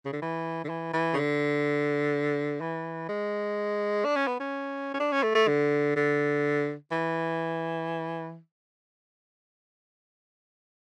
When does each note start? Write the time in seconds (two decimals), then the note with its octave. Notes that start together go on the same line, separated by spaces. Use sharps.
0.05 C#3
0.13 D3
0.22 E3
0.64 D3
0.69 E3
0.93 E3
1.13 C#3
1.17 D3
2.61 E3
3.09 G#3
4.04 D4
4.16 C#4
4.27 B3
4.40 C#4
4.94 C#4
5.00 D4
5.12 C#4
5.23 A3
5.35 A3
5.48 D3
5.96 D3
6.92 E3